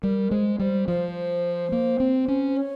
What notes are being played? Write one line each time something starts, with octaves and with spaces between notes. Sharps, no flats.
G3 A#4
G#3 C5
G3 C5
F3 C5
A#3
C4
C#4
C#5